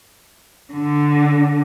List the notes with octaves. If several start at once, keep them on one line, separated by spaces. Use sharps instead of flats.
D3